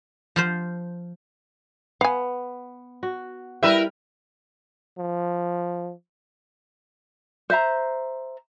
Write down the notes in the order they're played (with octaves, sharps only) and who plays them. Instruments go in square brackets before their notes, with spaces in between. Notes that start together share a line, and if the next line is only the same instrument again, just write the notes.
[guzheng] F3 F4 C5
[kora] B3 [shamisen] F5 G#5
[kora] F#4
[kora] G3 G5 [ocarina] E4 [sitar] A#4 B4 E5
[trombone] F3
[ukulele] C5 E5 A#5